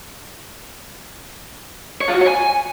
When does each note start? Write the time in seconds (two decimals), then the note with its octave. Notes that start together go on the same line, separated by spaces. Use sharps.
2.01 C#5
2.08 F4
2.14 F#4
2.21 C#5
2.27 G#5